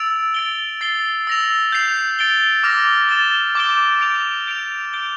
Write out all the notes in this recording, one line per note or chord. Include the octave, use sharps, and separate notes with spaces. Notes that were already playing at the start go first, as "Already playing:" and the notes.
Already playing: E6 A6 D7 F7
A6 D7 G7
A6 C7 G7
E6 A#6 F7
G6 C7 F7
A6 D7 G7
D6 F6 A#6 F7
A6 E7 G7
D6 G6 D7 G7
G6 D7 F7
G6 D7 F7
G6 D7 G7